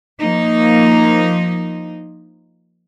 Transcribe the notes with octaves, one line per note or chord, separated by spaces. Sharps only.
F3 A#3 D#4